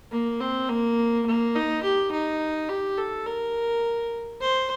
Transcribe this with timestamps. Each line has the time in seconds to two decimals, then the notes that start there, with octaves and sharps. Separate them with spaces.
0.11 A#3
0.40 C4
0.69 A#3
1.26 A#3
1.55 D#4
1.83 G4
2.12 D#4
2.69 G4
2.98 A4
3.27 A#4
4.41 C5